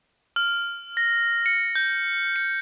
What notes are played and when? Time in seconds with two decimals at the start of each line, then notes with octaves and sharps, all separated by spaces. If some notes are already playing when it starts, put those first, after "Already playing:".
0.36 F6
0.97 A#6
1.46 C#7
1.75 G6
2.36 C#7